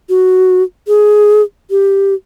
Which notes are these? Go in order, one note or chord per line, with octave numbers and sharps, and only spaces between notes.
F#4
G#4
G4